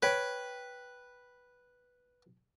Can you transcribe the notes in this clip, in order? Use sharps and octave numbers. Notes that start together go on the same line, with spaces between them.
B4 C#5 G5